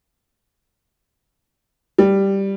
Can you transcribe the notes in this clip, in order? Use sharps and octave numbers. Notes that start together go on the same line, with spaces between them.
G3